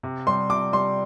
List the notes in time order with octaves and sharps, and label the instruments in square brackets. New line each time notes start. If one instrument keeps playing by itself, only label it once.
[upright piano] C3
G3 C6
C3 D6
G3 C6